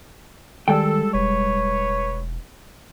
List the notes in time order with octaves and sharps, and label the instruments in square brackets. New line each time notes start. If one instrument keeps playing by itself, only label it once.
[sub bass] D#3 [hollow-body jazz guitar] G3 G#3 G5 [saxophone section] A4
[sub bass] E1 [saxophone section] B4 C#5